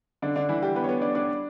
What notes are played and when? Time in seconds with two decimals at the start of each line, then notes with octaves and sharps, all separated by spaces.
0.22 D3 D4
0.36 D3 D4
0.49 E3 E4
0.62 G3 G4
0.75 B3 B4
0.84 C#5
0.89 B3 B4
1.02 D4 D5
1.15 D4 D5